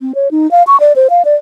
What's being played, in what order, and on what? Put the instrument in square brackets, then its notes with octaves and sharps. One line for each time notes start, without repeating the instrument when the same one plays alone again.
[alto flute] C4
C#5
D#4
F5
C#6
D5
C5
F5
D5